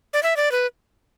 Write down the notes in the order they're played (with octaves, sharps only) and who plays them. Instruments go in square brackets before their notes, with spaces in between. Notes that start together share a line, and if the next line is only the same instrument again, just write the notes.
[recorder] D5
E5
D5
B4